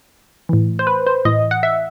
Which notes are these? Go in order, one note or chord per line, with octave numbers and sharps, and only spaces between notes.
A2 E3
C5
B4
C5
A2 E3 D#5
F#5
E5